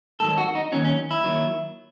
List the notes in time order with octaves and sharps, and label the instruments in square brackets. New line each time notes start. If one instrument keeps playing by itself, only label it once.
[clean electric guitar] G#2 D#3 F#3 A4
F#4
D#4
D#2 D#3 F#3 C#4
C#4
E4
D#2 D#3 F#3